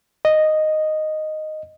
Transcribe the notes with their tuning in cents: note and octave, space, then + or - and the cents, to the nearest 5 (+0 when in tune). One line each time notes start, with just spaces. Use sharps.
D#5 -5